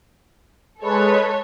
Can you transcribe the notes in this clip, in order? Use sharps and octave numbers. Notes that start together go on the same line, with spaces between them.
G#3 A4 B4 C#5